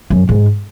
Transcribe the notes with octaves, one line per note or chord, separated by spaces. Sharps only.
F#2
G#2